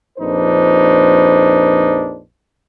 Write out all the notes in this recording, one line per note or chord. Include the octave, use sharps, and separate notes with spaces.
A#1 F2 D4 D#4 B4 C5